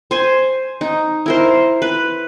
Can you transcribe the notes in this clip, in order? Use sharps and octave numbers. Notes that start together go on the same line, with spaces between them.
C5 G#5
D#4
E4 A#4 C5
B4